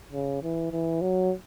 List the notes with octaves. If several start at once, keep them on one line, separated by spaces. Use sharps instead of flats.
C#3
E3
E3
F#3